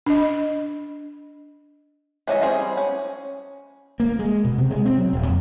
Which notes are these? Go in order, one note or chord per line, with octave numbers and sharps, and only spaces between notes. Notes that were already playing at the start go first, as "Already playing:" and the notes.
D4 D#5
E3 C#4 D#5 E5
G3 C4 G#4
C#4
A#3
G#3
B2
C3
G#3
C4
F#3
D#1
F2